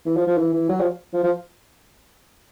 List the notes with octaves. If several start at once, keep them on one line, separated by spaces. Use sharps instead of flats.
E3
F3
F3
E3
E3
F#3
F3
F3
F3